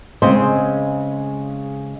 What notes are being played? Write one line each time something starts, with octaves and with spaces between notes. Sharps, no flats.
C#3 G#3 C4 G#4 C5